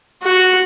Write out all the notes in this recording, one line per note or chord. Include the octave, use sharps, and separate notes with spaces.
F#4